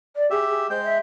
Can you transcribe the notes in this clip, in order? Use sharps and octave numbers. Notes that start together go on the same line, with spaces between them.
D5
G4 G#4 E5
G#4
G#3 C5 G5
E5